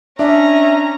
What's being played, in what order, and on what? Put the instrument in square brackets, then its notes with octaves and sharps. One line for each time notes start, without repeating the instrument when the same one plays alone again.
[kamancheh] C#4 A#5 [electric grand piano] D4 D5 [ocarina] E5